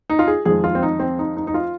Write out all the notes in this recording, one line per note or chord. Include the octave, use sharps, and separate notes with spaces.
D#4
F4
G#4
F2 D#3 G#3 G#4
F4
C4
D#4
C4
D#4
D#4
D#4
F4